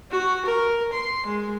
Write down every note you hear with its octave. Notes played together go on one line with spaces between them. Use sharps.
F#4
A#4
C6
G#3